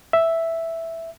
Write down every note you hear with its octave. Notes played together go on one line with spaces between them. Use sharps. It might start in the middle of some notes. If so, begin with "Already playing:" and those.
E5